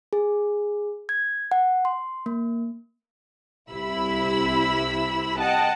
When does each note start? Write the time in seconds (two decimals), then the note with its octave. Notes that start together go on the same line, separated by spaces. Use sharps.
0.13 G#4
1.09 G#6
1.51 F#5
1.85 C6
2.26 A#3
3.71 C2 C3 E4 B5 E6
5.39 D#5 F#5 G5 A5